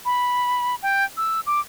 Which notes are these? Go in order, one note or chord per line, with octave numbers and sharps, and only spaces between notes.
B5
G5
E6
D6